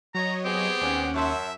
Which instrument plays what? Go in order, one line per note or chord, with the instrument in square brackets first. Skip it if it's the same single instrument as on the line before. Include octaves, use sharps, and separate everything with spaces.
[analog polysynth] F#3 C#5 D#5 [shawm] A#5
[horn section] B3 C4 G#4 [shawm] G4
[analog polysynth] D#2 C#4 F#5 [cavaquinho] D5 G#5
[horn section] F#2 E5 [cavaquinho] C#5 A5 C6